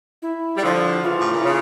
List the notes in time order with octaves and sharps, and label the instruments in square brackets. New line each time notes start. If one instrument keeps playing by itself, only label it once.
[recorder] E4
[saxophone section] G3
D3 F3
[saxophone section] C#3 E3 [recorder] F4
[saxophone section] A2
A#2
[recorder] E4
[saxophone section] C#3 [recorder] F4